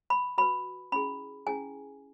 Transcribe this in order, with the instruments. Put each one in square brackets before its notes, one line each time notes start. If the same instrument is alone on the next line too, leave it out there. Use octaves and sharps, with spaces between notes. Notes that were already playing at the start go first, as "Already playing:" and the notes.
[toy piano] B5
F#4 B4 B5
C#4 E4 G#4 B5
C#4 E4 G#4 G#5